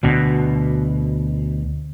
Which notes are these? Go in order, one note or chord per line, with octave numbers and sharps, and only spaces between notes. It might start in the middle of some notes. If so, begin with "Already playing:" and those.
D2 B2